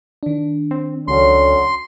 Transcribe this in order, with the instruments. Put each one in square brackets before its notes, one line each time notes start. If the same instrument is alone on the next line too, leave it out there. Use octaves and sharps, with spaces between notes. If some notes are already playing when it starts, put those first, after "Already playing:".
[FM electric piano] D#3 D4
[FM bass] C4
[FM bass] C#2 [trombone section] D3 F#3 C#4 [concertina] C6